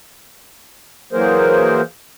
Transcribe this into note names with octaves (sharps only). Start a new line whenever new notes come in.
E3 F#3 A#3 G#4 A#4 C5